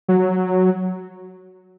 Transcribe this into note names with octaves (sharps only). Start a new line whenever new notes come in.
F#3